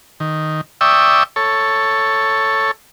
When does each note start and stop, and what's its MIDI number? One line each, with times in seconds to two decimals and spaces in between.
0.20 0.61 51
0.81 1.23 74
0.81 1.23 76
0.81 1.23 79
0.81 1.23 85
0.81 1.23 87
0.81 1.23 88
1.36 2.71 69
1.36 2.71 73